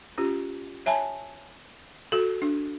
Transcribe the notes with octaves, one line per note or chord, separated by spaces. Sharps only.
C#4 F4 G4
C#5 E5 G#5 A5 B5
F#4 A4
D4